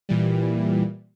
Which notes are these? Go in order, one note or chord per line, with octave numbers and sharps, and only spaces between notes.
A#2 E3 G3